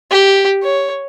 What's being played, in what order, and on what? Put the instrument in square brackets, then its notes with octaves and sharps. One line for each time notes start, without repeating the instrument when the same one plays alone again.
[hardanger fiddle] G4
C#5